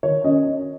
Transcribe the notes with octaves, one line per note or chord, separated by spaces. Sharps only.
D#3 C#5
C#4 D#5